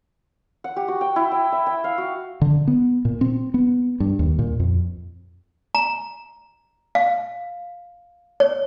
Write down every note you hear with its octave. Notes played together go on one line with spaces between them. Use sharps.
F#5
G4
F#4
G5
E4
G5
E5
G5
F5
F#4
D3
B3
A#2
C4
B3
G2
D#2
A#2
F2
A#5
F5
C#5